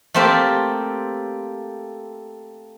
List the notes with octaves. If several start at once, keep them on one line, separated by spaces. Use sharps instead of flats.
A3 A#3 C4 F4 G4